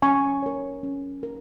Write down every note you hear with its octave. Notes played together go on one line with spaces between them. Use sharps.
C#4 G#5 C#6
A#4 C#5
C#4
A#4